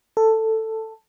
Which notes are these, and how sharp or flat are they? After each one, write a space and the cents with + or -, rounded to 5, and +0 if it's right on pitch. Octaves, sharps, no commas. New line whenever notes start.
A4 +10